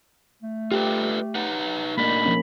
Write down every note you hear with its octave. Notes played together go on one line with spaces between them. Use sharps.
A3
F4 G4 A4 B4
D#4 B4 F#5
A#2 A3 A#3 D4 D#4 B5
F3 A#3 C#4